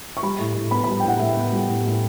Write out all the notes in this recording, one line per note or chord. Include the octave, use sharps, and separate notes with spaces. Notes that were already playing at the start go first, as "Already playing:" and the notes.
C#6
G3 B5
A2
A2
B3 B5
B5
G3
G5
A2 F#5
A2 E5
B3
G3
A2
A2